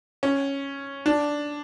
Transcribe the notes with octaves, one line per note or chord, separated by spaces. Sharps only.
C#4
D4